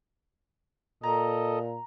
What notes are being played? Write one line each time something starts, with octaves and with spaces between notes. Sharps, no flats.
A#2 A4 D#5 A#5